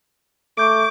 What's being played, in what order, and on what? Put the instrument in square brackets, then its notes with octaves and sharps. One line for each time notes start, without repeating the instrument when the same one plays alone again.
[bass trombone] A3 [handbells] C#6 G6 D7 [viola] D6